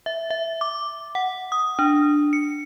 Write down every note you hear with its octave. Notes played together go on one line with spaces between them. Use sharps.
E5
E5
D6
F#5
D#6
D4
C#7